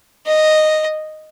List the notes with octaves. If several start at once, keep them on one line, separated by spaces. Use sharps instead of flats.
D#5